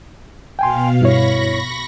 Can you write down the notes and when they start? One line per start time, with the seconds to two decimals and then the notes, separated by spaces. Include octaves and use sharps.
0.59 B2 F5 G5 G#5 C6
1.01 G2 E4 C#5 B5 C#6 A#6